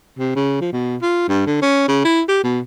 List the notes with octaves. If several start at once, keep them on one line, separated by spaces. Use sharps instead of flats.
C3
C#3
F3
B2
F4
G2
D3
C#4
C#3
E4
G4
B2